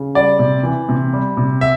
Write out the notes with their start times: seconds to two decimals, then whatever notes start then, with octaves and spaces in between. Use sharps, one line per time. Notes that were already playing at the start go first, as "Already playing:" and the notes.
Already playing: C#3
0.15 G3 D5
0.39 C3
0.63 E3
0.89 C3
1.13 G3
1.37 C3
1.61 E5